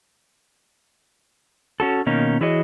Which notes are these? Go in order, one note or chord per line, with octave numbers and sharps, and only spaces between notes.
C#4 F#4 A4
B2 D#3 A#3 C#4 D#4
E3 E4 F#4 G#4 C#5 D#5